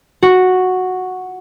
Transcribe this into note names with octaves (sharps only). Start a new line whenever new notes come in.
F#4